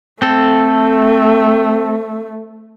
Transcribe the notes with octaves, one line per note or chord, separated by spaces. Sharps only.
A3 C4 A4